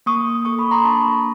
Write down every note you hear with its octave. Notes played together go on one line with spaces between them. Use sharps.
A#3 C#6 D#6
A#3
A4 C#6 D#6
B5 C#6
A#3
A#5 C6
D4 A5 B5
A#3